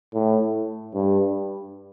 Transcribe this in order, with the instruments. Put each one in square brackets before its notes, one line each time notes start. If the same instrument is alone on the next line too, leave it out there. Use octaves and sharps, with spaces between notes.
[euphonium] A2
G2